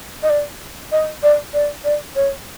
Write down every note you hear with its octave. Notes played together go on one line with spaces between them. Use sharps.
D#5
D5
D#5
D5
D5
D5
C#5